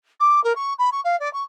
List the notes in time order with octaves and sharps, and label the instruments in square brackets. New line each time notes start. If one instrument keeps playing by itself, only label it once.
[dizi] D6
A#4
C#6
B5
C#6
F5
D5
C#6